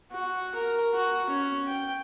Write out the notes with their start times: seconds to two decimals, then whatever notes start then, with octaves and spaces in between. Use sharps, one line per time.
0.11 F#4
0.55 A#4
0.94 F#4
1.30 C#4
1.68 G5